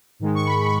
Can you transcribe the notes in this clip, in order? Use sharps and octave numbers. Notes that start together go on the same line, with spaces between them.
G#2 D#3 G#3
C#6
B5
B5